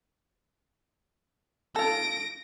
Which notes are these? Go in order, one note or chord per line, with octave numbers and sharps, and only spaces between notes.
F4 A4 A#6 D7